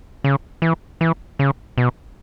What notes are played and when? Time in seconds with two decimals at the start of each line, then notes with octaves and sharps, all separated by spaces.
0.24 C#3
0.62 E3
1.01 E3
1.39 C#3
1.78 B2